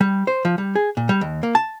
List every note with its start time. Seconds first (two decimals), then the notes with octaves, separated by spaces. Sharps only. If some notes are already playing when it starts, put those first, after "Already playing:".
0.01 G3
0.27 C5
0.45 F3
0.58 G3
0.75 G#4
0.97 A#2
1.09 G3
1.21 D#2
1.43 A#3
1.55 A5